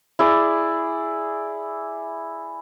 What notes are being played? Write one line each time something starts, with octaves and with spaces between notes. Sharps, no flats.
E4 G#4 D5